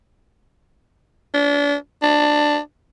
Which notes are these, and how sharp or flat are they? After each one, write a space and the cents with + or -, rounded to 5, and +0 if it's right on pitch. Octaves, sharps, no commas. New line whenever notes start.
D4 -35
D4 +10